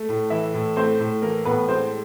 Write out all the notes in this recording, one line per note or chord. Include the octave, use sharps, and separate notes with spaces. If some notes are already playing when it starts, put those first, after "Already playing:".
Already playing: A3
A2
E3 E4 E5
A2
A3 C4 C5
A2
E3 A#3 A#4
A2 B3 B4
G#3 C4 C5